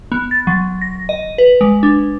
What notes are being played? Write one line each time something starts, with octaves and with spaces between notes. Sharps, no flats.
B3
A6
F#3
A#6
D#5
B4
G#3
D4